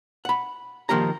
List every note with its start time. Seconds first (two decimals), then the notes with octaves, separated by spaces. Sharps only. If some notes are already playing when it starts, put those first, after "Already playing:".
0.25 F#5 B5
0.89 D#3 F3 A#3 G4 A#5